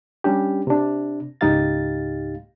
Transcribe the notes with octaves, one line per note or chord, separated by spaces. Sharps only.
G3 C#4 D4 G4
C3 D4
C#2 G#2 D#4 G4 F5 A6